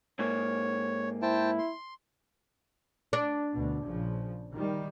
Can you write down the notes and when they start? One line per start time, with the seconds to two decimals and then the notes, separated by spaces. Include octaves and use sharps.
0.19 G#2 A#3 C#5
1.22 E4 C5 G5 A5
1.59 C6
3.13 D4
3.54 D2 B2
3.85 A#1 C#3 F3
4.53 D#3 G3